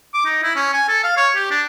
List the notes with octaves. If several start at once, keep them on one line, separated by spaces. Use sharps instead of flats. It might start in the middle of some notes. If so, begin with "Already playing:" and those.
D6
D#4
E4
C#4
G#5
A4
F5
C#5
G4
D4